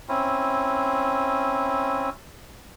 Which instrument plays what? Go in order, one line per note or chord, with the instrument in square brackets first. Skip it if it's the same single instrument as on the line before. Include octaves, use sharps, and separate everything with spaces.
[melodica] C4 C#4 E4